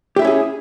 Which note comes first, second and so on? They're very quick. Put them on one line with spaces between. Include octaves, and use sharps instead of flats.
G4 E5 E4 C#4 G#4